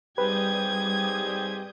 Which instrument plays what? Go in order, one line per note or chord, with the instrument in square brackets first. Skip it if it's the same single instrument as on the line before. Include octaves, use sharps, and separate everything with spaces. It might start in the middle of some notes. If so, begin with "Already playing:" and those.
[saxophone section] G#2 C4 G4 [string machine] G3 D#6 G6 [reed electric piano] B4 [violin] G#6